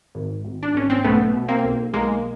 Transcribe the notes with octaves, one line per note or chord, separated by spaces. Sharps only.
G#1
G#1
D4
G#1 C#4
C4
B1 A3 B3
B2
A#3 C4
B1
B1 G#3 A#3